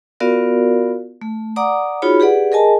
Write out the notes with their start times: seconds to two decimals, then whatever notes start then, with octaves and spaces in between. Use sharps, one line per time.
0.20 B3 F4 F#4 A#4 D5 F5
1.21 A3
1.56 D5 F#5 A#5 D6 D#6
2.02 D#4 F4 F#4 G#4 C#5 B5
2.20 G4 G#4 B4 D5 F#5
2.52 G#4 A#4 D#5 G#5 A5